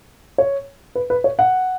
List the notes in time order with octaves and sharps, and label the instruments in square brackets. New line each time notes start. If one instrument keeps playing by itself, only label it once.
[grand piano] C#5
B4
B4
C#5
F#5